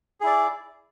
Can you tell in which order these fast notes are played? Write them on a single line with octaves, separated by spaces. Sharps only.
G#4 E4 D5